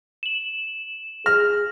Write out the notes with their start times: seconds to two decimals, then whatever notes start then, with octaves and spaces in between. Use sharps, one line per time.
0.23 E7 F#7
1.26 G#4 F6 A#6